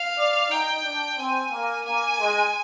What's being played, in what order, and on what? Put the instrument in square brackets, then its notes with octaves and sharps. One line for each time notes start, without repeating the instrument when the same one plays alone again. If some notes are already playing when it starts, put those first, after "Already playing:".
Already playing: [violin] F5
[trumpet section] D5
[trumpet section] D#4 [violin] G5
[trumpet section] D4
[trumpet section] C4 [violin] G#5
[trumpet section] A#3
[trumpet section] A#3 [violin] G#5
[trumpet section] G#3